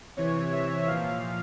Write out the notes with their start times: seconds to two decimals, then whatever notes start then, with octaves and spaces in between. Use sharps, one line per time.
0.17 C3 E3 C#5
0.52 E5
0.87 A#2 F3 F5